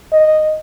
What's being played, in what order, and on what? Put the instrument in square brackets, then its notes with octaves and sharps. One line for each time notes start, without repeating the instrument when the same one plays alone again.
[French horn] D#5